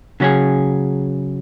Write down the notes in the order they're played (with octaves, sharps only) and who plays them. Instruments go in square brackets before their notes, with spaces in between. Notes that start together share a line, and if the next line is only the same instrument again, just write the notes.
[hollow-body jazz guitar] C#3 F#3 C#4 G#4